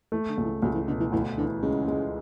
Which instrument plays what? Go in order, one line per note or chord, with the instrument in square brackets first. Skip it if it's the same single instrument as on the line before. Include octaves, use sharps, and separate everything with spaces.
[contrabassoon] E3 [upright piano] A3
[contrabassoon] D3
[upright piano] C#2
[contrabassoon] E3
[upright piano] C#2 [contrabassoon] F#3
[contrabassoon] E3
[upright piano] B2 [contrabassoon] D3
[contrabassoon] E3
[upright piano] D2 [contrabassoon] E3
[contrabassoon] D3 [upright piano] E3
[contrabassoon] C#3 [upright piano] G#3
[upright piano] G#3